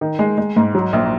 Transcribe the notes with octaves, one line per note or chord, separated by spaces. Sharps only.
D#3
G#3
G#3
G#2
F#3
A#1